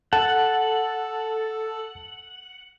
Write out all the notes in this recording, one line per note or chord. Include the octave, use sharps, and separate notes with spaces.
A4 F#5 A5